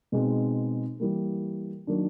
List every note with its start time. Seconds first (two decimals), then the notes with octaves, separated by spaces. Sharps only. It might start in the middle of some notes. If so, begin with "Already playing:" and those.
0.12 B2 G#3 C4 D#4 G#4
1.00 E3 G3 A#3
1.87 D#3 F#3 A#3 D4